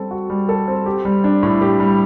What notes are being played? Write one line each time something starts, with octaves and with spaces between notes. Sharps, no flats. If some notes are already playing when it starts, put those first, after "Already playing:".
Already playing: G3 C4 A4
F#4
G3
A4
C4
G4
G3
D4
A2
G4
G3